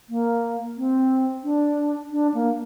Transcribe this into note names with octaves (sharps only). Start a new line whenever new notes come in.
A#3
C4
D4
D4
A#3